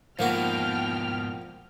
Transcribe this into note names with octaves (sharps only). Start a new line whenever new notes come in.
G#2 B2 F3 A#3 F#4 G5 F6